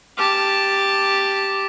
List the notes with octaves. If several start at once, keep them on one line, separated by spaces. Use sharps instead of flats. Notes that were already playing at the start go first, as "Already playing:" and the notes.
G4 A5